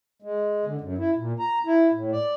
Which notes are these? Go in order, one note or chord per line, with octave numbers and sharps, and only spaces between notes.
G#3
D3
F#2
E4
A#2
A#5
E4
A2
D5